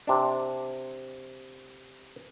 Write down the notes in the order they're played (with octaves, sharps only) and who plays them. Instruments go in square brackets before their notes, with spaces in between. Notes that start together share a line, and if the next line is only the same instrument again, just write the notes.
[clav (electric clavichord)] C3 D4